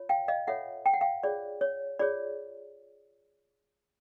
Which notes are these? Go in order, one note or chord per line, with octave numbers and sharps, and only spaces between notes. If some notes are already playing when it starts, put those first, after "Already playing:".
Already playing: F4 C#5
F5 G5
D#5 F5
F4 A4 C#5 E5 F#5
G5
F#5
F5 G5
F4 G#4 C#5 D5
C#5
F4 G#4 C#5 D5